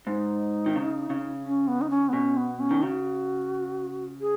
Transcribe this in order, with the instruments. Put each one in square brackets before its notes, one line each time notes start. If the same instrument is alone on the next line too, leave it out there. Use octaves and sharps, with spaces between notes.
[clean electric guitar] G#2 [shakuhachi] D#4
[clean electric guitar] D#3
C#3
C#3
[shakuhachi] C#4
B3
D#4
C#4
B3
[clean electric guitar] B2 [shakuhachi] C#4
[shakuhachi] B3
C#4
[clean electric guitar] D#3
[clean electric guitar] C#3 [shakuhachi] F#4
[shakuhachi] G#4